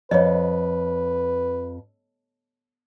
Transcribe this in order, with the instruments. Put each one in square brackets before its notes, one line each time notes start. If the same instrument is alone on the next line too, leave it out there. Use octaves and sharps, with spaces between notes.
[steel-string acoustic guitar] F2 [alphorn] B4 [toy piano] C#5 D#5